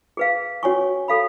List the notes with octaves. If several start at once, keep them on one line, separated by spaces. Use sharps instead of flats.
G#4 B4 F5
C#4 F#4 C#5 G#5 C#6
A4 F5 B5